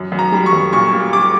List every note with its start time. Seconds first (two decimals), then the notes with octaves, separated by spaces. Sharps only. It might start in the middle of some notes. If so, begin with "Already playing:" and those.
Already playing: F#2
0.12 F#2
0.19 A#5
0.32 G3
0.46 C#6
0.53 F#2
0.73 A#2 C#6
0.93 G3
1.13 G3 D6